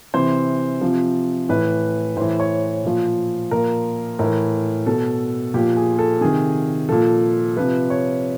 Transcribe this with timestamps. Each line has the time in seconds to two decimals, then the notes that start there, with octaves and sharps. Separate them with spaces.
0.14 C3 E3 C5
0.81 C3 F3
1.49 A2 E3 B4
2.17 A2 C5
2.21 E3
2.40 C#5
2.84 A#2 F3
3.51 A#2 F3 A#4
4.19 A2 E3 A#4
4.86 B2 A4
5.54 A#2 F3 G4
5.77 G#4
5.99 A4
6.21 C3 D#3 G#4
6.89 A#2 F3 A4
7.57 C3 F3 B4
7.90 C#5